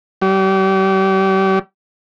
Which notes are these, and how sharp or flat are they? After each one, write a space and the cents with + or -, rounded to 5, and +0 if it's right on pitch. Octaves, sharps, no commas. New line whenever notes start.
G3 -35